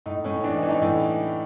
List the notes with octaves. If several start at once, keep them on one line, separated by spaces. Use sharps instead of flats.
A2 D#4
A2 C#4
E3 D4
D#4
E3
D#4
A2